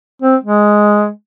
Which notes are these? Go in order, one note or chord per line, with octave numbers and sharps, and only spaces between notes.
C4
G#3